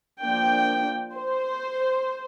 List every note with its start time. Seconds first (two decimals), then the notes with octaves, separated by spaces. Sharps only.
0.23 F3 A#3 D4 G5
1.15 C5